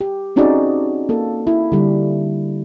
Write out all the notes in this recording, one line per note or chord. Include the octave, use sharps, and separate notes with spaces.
G4
C4 C#4 D#4 F#4 G#4 D5
A#3 A4
E4
D3 G3